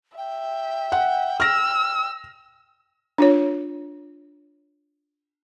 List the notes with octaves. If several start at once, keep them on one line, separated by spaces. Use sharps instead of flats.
E5 G5
F#5
E6 F6 A#6
D4 F4 C#5